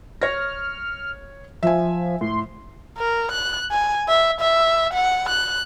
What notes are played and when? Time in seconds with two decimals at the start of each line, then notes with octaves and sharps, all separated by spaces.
0.22 C#5 F6 A#6
1.63 F3 E5 G#5
2.21 A2 C6
2.98 A#4
3.32 F#6
3.71 G#5
4.08 E5
4.40 E5
4.93 F#5
5.29 F#6